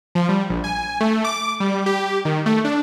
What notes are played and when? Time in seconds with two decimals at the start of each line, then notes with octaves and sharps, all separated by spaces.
0.15 F3
0.29 G3
0.50 A#1
0.64 G#5
1.00 A3
1.24 D6
1.60 G3
1.86 G4
2.25 D#3
2.46 A3
2.64 D4